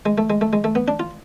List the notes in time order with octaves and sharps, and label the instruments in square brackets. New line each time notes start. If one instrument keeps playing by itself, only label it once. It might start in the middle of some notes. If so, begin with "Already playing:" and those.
[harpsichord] G#3
A3
G#3
A3
G#3
A3
B3
D4
F4